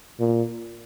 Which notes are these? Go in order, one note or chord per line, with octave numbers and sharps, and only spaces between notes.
A#2